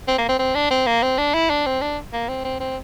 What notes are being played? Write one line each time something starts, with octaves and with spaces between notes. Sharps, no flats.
C4
A#3
C4
C4
D4
C4
A#3
C4
D4
E4
D4
C4
D4
A#3
C4
C4
C4